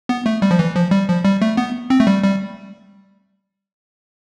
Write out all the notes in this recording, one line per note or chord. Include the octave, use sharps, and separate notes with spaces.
B3
A3
G3
F3
E3
F3
G3
F3
G3
A3
B3
C4
A3
G3
G3